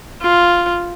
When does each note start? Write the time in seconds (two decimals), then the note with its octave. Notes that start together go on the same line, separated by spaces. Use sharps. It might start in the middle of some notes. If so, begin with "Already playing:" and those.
0.22 F4